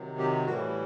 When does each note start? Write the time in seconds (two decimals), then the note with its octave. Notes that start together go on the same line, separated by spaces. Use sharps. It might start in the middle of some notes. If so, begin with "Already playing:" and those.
Already playing: C3 D#3 F#3
0.19 G4
0.46 A2 E3 G3 F#4